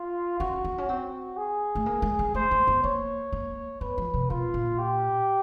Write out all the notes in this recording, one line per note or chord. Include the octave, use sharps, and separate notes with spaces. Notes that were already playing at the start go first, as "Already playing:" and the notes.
Already playing: F4
C#4 F#4
C4
C#4
C4 F#4
G#4
A3
A#3
G#3
G#3
A3 C5
A#3
B3
A#3 C#5
A#3
B3 B4
F3
C3
B2 F4
A#2
G4